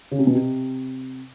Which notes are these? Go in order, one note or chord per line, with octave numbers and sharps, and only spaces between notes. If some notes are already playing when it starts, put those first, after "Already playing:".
C#3
C3
B2
C3